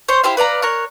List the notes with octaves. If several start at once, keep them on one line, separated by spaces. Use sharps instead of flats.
C5 C#5 C6
E4 G4 C5 F5
B4 D5 F5 A#5
A#4 C#5 F#6